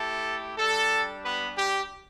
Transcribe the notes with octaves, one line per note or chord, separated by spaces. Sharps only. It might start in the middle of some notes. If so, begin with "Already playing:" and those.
Already playing: A3 E4 G4 A4
G3 D4 G4 A4
B3 B4
G4